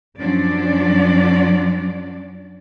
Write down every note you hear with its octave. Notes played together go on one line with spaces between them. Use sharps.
F#2 F3 F#3 C#4 D4 D5